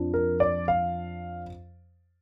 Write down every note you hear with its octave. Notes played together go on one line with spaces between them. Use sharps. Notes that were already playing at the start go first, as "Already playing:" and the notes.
Already playing: F2 F3 D4
A#4
D5
F5